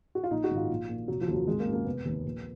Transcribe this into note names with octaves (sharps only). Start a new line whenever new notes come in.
F#4
F4
A#1 D#4
F#4
G#2 D#3
F4
A#1
A#2
F1 F#3
F3
D#2 C#3
F#3
G#1 G#3
A#3
F#2 D#3
A#3
F1 B3
D#2 D#3
A#1